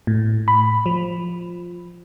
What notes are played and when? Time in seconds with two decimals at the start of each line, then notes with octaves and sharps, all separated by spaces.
0.07 A2
0.48 B5
0.86 F3